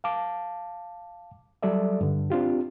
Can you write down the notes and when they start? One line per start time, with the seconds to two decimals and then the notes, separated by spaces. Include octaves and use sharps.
0.04 F5 A5 D6
1.63 F#3 G3 A4 D5 E5
2.01 G2 D3
2.30 C4 D4 F4 G4